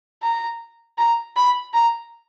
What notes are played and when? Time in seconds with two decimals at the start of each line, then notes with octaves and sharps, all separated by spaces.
0.23 A#5
0.98 A#5
1.36 B5
1.73 A#5